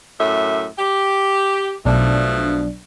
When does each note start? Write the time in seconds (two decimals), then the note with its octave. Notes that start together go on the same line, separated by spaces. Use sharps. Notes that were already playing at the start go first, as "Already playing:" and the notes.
0.18 F#2 A2 E5
0.77 G4
1.85 B1 B2 F3 A3 D4